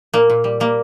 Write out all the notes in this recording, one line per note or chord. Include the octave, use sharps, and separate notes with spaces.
A#2 A#3
A#2
G3
G3 A#3